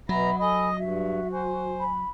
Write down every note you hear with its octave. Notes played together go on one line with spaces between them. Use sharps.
B2 F#3 E5 F#5 A#5 B5
A4 D#5 G#5 B5 D#6
G2 F#4 E5
C5 G#5
B5